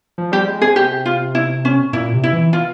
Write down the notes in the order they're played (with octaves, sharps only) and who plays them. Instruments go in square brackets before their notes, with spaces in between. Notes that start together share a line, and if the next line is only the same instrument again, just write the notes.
[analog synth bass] F3
[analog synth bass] G3 [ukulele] G4
[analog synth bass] G#3
[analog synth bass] C3 [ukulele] G#4
[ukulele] G4
F4
E4
C#4
[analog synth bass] A#2 [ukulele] E4
[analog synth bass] C3
[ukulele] E4
[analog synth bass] E3
[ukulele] F4